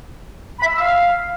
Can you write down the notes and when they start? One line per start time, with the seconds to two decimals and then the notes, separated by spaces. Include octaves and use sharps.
0.60 B5
0.65 E5
0.71 B5
0.76 E6
0.81 F5